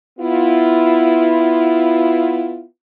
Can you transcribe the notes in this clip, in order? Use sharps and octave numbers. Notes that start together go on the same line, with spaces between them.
B3 E4 F4